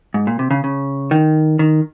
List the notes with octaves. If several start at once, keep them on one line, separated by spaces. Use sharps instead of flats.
G#2
A#2
C3
C#3
C#3
D#3
D#3